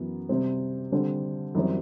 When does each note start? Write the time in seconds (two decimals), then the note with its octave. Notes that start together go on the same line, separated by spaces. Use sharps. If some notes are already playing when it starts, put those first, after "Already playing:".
Already playing: F#2 E3 B3
0.29 C3 G3 C4
0.92 D3 G3 C4
1.55 F#2 E3 G3 C4